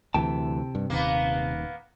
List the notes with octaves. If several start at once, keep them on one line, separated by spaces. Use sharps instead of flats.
D2 C3 E3 G5 A5
G2
D#1 D#2 A#3 B3